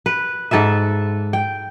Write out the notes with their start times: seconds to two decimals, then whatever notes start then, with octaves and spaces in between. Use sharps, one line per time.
0.06 B4
0.51 G#2 A4 B4 E5
1.33 G5